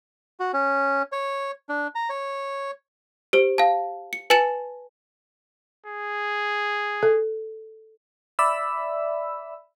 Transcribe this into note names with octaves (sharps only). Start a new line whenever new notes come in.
F#4
C#4
C#5
D4
A#5
C#5
G4 C5
F5 A5
C#7
B4 G#5 A5 A6 C#7 E7
G#4
A4
D5 E5 B5 E6